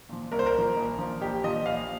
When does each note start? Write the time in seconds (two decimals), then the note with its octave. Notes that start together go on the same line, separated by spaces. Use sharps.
0.09 A#2 F3
0.32 C2 A#4
0.39 C5
0.46 A#4
0.54 A#2 F3
0.77 A#1
0.98 A#2 F3
1.21 A#1 G4
1.44 A#2 F3 D#5
1.66 A#1 F5